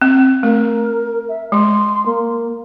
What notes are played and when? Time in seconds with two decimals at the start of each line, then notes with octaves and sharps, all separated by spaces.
0.02 C4
0.43 A3 A#4
1.29 E5
1.52 G#3 C6
2.06 A#3